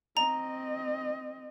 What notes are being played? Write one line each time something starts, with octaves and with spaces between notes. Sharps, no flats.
C4 D#5 A#5